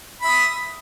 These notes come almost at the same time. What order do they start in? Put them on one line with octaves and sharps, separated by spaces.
B5 E5 D#6